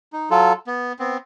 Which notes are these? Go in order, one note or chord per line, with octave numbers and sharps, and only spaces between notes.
D#4
F#3 F4 A4
B3
B3 C4